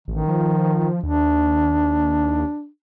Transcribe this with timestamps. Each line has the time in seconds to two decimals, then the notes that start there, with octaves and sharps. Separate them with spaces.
0.08 A1 D#3
0.28 F3
1.03 D#2 D4